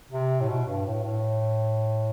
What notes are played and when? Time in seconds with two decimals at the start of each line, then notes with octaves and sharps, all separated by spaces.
0.12 C3
0.41 A2
0.49 B2
0.67 G2
0.86 A2
1.04 A2